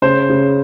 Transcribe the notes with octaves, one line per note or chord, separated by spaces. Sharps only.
C#3 C5
C#3